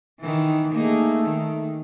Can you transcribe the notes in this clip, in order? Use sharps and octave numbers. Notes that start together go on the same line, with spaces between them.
D#3 E3
A3 A#3 D#4 G#4
D#3